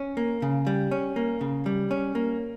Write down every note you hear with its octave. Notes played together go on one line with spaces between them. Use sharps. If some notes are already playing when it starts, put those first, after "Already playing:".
Already playing: C#4
A#3
C#3
G3
C#4
A#3
C#3
G3
C#4
A#3